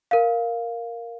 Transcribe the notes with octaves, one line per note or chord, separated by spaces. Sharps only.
A#4 F5